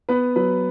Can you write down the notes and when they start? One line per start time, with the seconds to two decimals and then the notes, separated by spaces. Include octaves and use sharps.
0.09 B3 B4
0.36 F#3 B4